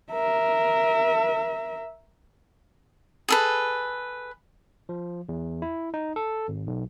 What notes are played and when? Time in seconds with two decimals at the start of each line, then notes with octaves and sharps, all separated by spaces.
0.11 A#4 E5
3.29 G#4 A4 B4
4.89 F3
5.29 E2
5.62 E4
5.94 D#4
6.16 A4
6.48 G#1
6.67 B1